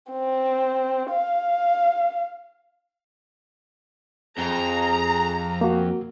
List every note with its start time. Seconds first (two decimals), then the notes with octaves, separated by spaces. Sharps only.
0.11 C4
1.10 F5
4.38 F2 G#4 A#5
5.61 A#3 F#4